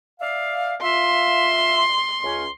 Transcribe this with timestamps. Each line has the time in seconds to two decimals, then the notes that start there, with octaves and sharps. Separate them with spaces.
0.21 D5 E5 F5
0.82 F4 E5 C6
2.24 C#2 C#4